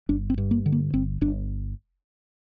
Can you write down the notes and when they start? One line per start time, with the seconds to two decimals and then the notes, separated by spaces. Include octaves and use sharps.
0.09 G1 D4
0.30 C4
0.38 G2
0.51 A#3
0.66 D3
0.72 A#3
0.94 G1 C4
1.21 G1 D4